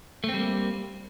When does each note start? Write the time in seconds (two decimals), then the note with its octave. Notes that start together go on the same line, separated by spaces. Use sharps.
0.24 A3
0.29 C4
0.34 G3
0.39 A#3